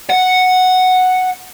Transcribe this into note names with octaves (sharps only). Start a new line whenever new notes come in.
F#5